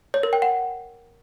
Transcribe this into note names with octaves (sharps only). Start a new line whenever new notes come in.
C#5
A#4
G5
F#5